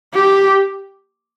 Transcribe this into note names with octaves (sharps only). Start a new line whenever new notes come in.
G4